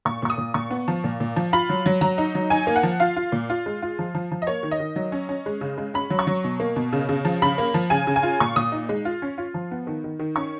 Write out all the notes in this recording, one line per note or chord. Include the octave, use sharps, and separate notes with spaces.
A#2 C#6
A#2 C#6
D#6
A#2
A#2 C#6
B3
F3
A#2
A#2
F3
F4 B5
F#3
F#3
F#3 A#5
D#4
F#3
D#4 G#5
A#3
F#5
F3
F4 F5
F4
A#2
F4
G#3
F4
F3
F3
F3
D#5
A#3 C#5
D#3
D#5
D#3
F#3
C#4
C#4
G#3
C#3
G#3
C#4 B5
F#3
C#6
F#3
B2
A#3
B2
C#3
C#3
F3
C#3 B5
A#3
F3
C#3 G#5
C#3
G#5
F4
A#2 C#6
A#2 D#6
D#4
G#3
F4
C#4
F4
F3
B3
D#3
D#3
D#3
C#4 C#6